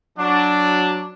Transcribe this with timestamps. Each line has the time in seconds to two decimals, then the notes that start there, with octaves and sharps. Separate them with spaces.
0.18 F#3 D4